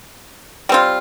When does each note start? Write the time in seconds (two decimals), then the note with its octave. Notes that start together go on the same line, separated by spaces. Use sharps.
0.69 G3 C4 F4